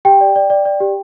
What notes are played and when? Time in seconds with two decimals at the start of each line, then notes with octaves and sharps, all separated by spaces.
0.05 G4 G5
0.21 D5
0.36 D5
0.50 D5
0.65 D5
0.80 G4